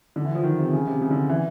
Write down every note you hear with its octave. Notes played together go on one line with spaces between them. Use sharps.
D3
E3
F3
D#3
C3
C#3
C3
C#3
D3
E3